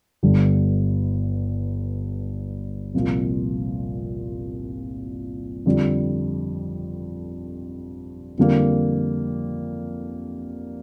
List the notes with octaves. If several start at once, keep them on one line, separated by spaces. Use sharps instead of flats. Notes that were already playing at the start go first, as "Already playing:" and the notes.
G1 G2 D3 G3
C2 A#2 F3
F2 D3 G3
F2 D3 G3 A#3